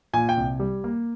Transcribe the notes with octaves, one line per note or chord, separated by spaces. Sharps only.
A#2 G#5
G5
C2
G3
A#3